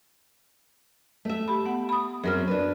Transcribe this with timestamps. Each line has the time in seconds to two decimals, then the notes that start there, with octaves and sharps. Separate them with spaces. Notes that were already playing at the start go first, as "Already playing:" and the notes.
1.25 A3 E5
1.48 G4 B5
1.66 B3 F#5
1.89 B5 D#6
2.24 F#2 F#3 C4 G#4 A#4 F6
2.48 D4 B4